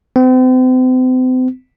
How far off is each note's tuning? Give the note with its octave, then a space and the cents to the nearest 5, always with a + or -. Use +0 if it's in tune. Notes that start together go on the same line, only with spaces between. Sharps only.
C4 -40